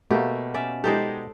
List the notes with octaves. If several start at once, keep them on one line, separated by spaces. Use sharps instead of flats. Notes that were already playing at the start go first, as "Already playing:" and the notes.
B2 A3 A#3 G4
C#4 D5 E5
G#3 D#4 G4 A4 C5 D5